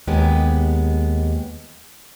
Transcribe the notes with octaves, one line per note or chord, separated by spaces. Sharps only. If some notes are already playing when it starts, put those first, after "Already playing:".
D#2 G#3 B3 G4